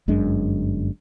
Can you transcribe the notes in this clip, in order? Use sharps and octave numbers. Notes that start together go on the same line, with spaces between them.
G1 F#2 G#3 D4